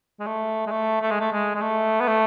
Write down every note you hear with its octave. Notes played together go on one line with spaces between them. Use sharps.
G#3
A3
G#3
A3
A3
G#3
A3
G#3
G#3
A3
B3
A3